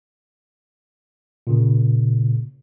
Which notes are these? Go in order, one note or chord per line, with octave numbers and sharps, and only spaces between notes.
A#2 C#3